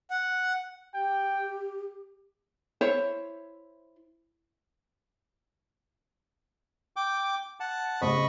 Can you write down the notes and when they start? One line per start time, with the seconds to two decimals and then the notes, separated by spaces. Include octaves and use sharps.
0.10 F#5
0.94 G4 G5
2.81 E4 C5 C#5 E5
6.96 G5 D6
7.60 F#5 A5
8.01 A1 C#3 C5 D#5 B5 C#6